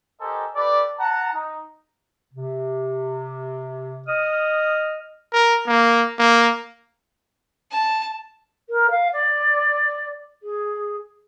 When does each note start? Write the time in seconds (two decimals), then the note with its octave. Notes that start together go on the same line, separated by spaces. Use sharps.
0.21 G4 A4 A#4 C5 D#5 G#5
0.55 G4 A4 B4 D5
0.99 F#5 A5 A#5
1.33 D#4
2.33 C3
4.08 D#5 D#6 F6
5.33 A#4
5.67 A#3
6.19 A#3
7.72 A5
8.69 A#4
8.90 F5
9.13 D5
10.42 G#4